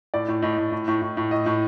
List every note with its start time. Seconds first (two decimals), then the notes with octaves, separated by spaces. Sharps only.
0.14 A2 D5
0.28 A2
0.42 A2 D#5
0.58 A2
0.72 A2
0.88 A2
1.02 A2
1.17 A2
1.31 A2 D#5
1.46 A2